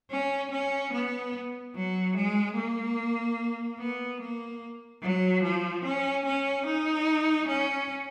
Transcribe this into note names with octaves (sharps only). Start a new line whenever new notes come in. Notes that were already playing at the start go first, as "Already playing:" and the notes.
C#4
C#4
B3
F#3
G#3
A#3
B3
A#3
F#3
F3
C#4
C#4
D#4
C#4